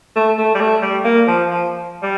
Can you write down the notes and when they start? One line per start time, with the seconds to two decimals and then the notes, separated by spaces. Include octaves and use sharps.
0.16 A3
0.38 A3
0.55 G3
0.61 A3
0.82 G3
1.05 A#3
1.28 F3
1.50 F3
2.02 G3